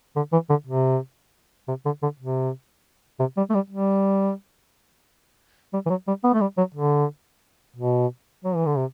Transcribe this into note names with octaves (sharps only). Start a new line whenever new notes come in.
D3
E3
D3
C3
C3
D3
D3
C3
C3
G3
A3
G3
G3
G3
E3
F#3
G3
B3
A3
G3
F#3
D3
B2
F#3
E3
D3
C3